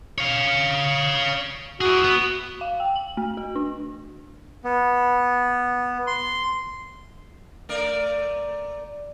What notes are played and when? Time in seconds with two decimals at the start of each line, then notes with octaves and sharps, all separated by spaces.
0.18 C#5 F5
1.81 E4 F#4 G#4
2.04 B3
2.61 F5
2.80 G5
2.96 F#7
3.17 A3
3.37 F#4
3.55 D4
4.64 B3
6.07 C6
7.69 A3 A#4 D5